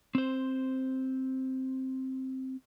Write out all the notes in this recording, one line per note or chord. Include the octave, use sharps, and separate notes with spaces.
C4 C5